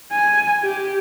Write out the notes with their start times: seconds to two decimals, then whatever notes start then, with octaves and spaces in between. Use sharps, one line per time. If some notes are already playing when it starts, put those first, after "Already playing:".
0.12 G#5
0.63 G4